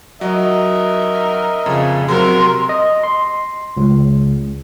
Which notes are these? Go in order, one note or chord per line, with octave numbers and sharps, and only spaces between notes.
F#3 A#4 D#5 E5
F2 C#3
C3 F#3 A#4 C6
D#5
C6
C#2